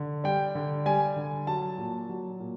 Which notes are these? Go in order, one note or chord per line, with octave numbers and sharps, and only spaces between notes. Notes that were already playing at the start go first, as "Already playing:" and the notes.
Already playing: D3
G3 G5
D3
G3 G#5
D3
F#3 A5
A#2
F#3
A#2